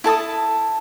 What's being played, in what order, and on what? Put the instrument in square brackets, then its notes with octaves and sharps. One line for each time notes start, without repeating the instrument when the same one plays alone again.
[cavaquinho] E4 A4 A5 D#6